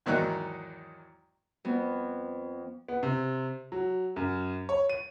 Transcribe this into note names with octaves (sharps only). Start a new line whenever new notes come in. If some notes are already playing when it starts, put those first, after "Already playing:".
E2 G#2 D#3 F#3 D#4 F#6
F2 B3
B3
C3
F#3
F#2
C#5
D#7